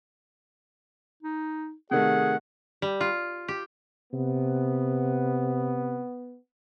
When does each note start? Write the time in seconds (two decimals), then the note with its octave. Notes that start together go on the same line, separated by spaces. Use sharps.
1.23 D#4
1.91 C3 D#3 A3 G#4 F#5
2.82 G3
3.01 F4
3.48 G4
4.13 C3 B3